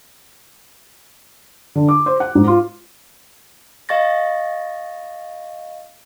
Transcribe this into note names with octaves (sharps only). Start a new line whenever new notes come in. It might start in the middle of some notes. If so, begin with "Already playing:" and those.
D3
D6
C5
F#5
G#2
F4
D#5 F5 C#6 A6 A#6